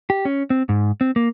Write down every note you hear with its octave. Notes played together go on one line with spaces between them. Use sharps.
G4
C#4
C4
G#2
C4
A#3